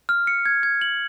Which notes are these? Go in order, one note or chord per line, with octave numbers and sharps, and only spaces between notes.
F6
C#7
G#6
G#6
F#7